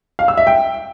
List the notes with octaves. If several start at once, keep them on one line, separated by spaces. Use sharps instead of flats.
F5
E6
E5
G5